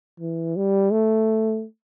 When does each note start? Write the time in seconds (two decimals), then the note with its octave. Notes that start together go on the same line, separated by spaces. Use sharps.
0.20 E3
0.56 G3
0.91 A3